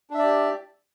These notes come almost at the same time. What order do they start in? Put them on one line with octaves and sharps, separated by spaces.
D4 E5 D5 G4